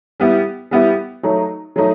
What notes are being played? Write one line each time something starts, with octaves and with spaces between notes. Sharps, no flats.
G3 B3 E4 G4
G3 B3 E4 G4
F#3 A3 D#4
F#3 A3 D#4